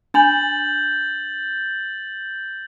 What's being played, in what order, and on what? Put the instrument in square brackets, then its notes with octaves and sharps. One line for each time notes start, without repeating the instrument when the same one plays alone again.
[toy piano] D4 G#5 B5 [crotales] G6 A6 F#7